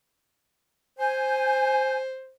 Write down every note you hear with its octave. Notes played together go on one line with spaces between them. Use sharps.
C5 G#5 G6